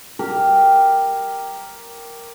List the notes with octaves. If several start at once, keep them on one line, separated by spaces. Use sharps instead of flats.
G4 A#4